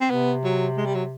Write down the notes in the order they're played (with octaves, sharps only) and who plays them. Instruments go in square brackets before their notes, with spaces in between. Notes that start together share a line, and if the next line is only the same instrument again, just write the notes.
[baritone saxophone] C4
[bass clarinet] C3 [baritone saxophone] B3
[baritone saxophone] F#3
G#3
G3
F#3